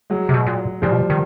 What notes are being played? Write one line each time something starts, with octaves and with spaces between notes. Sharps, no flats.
F#3 G#3
C3
B2
A#2
A#2 F3 G3
B2
D#3